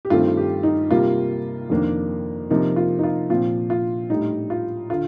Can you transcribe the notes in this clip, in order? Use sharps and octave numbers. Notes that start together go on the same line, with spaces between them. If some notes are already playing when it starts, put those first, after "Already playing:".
G4
G2 D#3 A3 C4 F4
G4
D#4
C3 G3 A#3 F4
F2 D#3 A#3 D4
C3 F3 A#3 D#4
F4
D#4
F4
A#2 F3 C4 F4
F4
A2 G3 D4 D#4
F4
D3 F4